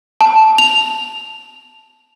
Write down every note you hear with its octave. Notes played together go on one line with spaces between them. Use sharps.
A5
F7